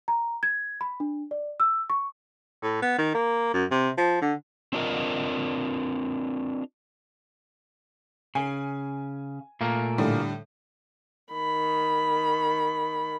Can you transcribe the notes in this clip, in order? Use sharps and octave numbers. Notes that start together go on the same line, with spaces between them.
A#5
G#6
B5
D4
D5
E6
C#6
A2
B3
D#3
A#3
F#2
C3
F3
D3
C4 D4 F4 A#4 D#5
C#3 G#5
A#2 A3 A#3
A2 D3 G3
D#3 B5